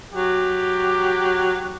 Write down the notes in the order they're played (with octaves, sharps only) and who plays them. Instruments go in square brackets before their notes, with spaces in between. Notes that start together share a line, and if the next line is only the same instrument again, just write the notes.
[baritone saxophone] F#3 [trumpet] G4